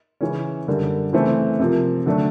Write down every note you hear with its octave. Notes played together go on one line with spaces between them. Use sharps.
C#3 E3 G#3 C#4
F#2 D3 G3 A#3
C#3 E3 A3 C4
C3 F3 A#3
D3 F#3 A3 D4